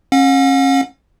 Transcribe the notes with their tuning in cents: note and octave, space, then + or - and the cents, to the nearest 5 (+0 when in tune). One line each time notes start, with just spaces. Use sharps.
C#4 -35 F#5 -45